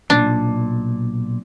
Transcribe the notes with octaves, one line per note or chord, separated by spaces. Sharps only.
B1 A#2 D4